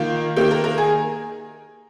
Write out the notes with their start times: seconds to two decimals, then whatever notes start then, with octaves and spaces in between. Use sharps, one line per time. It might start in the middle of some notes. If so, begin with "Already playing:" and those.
Already playing: D#3 A#3 F4
0.36 D#3 A#3 G4
0.51 A#4
0.64 A#4
0.78 G#4